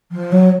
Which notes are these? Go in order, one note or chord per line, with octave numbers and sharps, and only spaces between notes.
F3
F#3